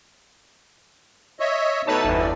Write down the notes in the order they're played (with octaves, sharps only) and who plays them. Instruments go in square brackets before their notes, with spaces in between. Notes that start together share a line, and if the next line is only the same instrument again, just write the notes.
[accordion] C#5 D#5 E5
[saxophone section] B2 E3 A3 [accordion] D#4 [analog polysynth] B4 C#5 A5
[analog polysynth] G1 E2
[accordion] D5